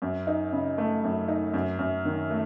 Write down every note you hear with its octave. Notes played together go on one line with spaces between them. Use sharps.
F#2
D#4
C#3
A3
F#2
D#4
F#2
F#2
D#3
A3